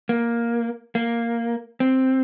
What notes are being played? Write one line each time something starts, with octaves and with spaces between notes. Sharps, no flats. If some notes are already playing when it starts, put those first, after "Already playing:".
A#3
A#3
C4